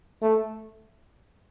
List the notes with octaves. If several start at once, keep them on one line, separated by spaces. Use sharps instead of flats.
A3